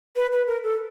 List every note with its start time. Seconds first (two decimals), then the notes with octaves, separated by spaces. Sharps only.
0.16 B4
0.32 B4
0.47 A#4
0.63 A4